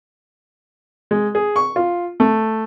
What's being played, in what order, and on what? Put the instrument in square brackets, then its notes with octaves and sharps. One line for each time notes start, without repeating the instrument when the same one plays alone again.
[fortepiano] G#3
G#4
C#6
F4
A3